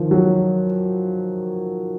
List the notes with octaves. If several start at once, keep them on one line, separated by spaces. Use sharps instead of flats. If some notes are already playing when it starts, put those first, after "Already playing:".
Already playing: D#3 F3
F#3